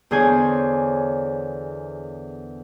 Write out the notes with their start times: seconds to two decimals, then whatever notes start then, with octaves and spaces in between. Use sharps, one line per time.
0.11 E2 D3 G#4 C5 C#5 G#5